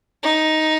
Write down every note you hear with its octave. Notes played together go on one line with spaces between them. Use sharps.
D#4